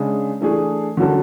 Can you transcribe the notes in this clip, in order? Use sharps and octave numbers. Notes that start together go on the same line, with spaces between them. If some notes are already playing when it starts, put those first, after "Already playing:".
Already playing: C#3 G#3 D4 G#4
E3 A3 D4 G#4
D3 F#3 C#4 F#4 A4